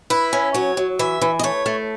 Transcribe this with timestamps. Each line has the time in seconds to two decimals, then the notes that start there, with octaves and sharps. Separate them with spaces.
0.10 E4 B4
0.33 C#4
0.54 F#3 C#5
0.77 F#3
0.99 E3 E5
1.21 E3
1.39 D#5
1.43 A3 C#5
1.66 A3